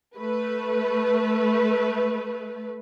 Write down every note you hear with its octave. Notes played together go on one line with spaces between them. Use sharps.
A3 B4